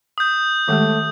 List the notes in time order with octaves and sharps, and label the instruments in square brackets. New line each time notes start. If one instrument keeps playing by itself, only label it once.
[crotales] D#6 G6
[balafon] D#3 G#3 G4 [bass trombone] A3